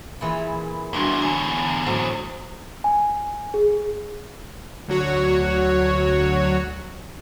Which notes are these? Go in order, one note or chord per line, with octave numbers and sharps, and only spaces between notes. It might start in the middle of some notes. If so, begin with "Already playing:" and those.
A#2 E3 G#4 B5
E2 A#2 E3 G3 D4 F#4 C#5 G5
E2 D3 G#5
A2 F#3 C5 D#6
G#5
G#4
D2 F#3 F#4 C#5